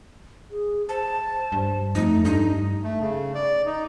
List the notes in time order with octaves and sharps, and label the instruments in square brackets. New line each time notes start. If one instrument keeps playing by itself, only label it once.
[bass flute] G#4
[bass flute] C5 [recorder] A5
[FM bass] G2
[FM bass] F2 [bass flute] A3 [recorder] D#4
[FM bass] G2 [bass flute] D4 [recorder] D#4
[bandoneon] A3
C#3
D5
D#4